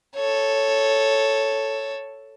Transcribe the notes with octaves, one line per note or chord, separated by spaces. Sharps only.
A4 C#5